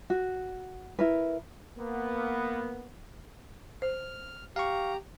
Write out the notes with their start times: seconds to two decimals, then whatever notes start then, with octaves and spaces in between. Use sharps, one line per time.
0.10 F#4
0.99 E4 A#4 B4
1.78 A#3 B3
3.82 C5 F6
4.56 G4 F5 A#5 C#6